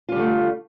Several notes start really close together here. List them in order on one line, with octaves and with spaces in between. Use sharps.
F4 G3 D3 A3